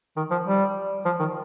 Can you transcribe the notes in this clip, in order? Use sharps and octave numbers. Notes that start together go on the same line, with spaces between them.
D#3
F3
G3
F3
D#3